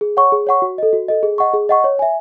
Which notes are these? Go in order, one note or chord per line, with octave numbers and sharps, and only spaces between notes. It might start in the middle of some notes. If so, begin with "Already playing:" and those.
G#4
C#5 F#5 C#6
G#4
C#5 F#5 C#6
F#4
A4 D#5
F#4
A4 D#5
G#4
D#5 F#5 C#6
G#4
D#5 F#5 C#6
C#5
E5 G#5